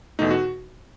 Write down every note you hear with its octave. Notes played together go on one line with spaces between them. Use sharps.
E2 B2 A3 D#4
F#4